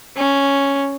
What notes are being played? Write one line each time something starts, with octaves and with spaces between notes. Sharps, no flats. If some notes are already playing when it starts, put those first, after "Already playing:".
C#4